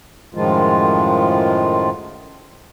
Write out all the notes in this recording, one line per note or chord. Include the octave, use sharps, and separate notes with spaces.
F#2 A2 D#3 F3 G#3 F4